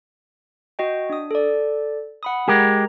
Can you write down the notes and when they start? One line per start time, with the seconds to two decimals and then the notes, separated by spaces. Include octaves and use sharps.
0.79 F#4 D#5 G5
1.10 D4 D#6
1.31 A4 D5
2.23 F#5 B5 D#6
2.48 G#3 G4 A#4 A#5